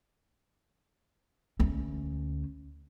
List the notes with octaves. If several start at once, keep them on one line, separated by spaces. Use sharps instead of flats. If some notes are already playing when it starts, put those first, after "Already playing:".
D2 C#4